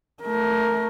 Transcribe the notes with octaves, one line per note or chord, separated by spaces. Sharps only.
A3 A#4